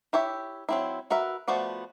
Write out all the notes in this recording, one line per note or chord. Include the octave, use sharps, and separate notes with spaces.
E4 G4 C#5 E5
F#3 C4 E4
F#4 A#4 B4 E5
F3 A3 B3 F#4 D5